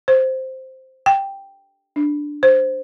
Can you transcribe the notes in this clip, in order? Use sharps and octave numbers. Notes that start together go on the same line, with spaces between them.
C5
G5
D4
C5